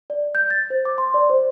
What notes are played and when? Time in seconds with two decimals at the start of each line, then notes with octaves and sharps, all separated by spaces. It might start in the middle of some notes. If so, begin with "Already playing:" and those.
0.10 D5
0.35 G6
0.50 A6
0.70 C5
0.85 D6
0.98 C6
1.14 D5
1.30 C5